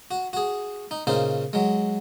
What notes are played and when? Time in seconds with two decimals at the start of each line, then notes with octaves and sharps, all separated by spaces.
0.11 F#4
0.33 F#4 G#4
0.91 D#4
1.07 A#2 C#3 D#4 C5
1.53 F#3 G#3